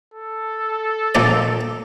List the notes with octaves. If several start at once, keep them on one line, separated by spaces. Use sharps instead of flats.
A4
A#1 D#4 D5